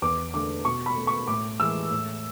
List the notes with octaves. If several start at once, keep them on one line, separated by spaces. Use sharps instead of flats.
E2 D6
D3 A3 D6
B2 C#6
B5
A3
C#6
A2 D6
E3 G#3 E6
A2